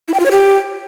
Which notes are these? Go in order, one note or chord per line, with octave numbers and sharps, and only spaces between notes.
E4
G5
F4
C#5
G4